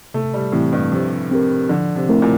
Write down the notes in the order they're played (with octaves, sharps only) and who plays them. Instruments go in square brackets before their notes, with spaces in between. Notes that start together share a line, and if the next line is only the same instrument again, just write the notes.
[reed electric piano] C3 [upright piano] A3
[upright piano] G3
[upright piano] A2 [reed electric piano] E3 A3 C4 G4
[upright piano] G2
[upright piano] C3 [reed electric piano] F3
[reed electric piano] C4 G4 A#4
[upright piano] D3 [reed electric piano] F3
[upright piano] C3
[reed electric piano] A3 C4 E4 A#4
[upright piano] A#2